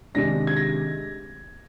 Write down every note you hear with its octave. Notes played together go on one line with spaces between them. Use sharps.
C3 D#3 G#3 D4 A#6
G#6
A#6